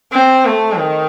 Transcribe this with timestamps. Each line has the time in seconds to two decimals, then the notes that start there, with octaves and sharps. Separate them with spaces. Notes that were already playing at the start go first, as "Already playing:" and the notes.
0.13 C4
0.46 A3
0.78 D#3